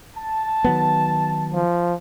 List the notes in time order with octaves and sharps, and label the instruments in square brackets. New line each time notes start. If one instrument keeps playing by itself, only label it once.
[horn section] A5
[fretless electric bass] D#3 F#3 B3
[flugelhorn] F3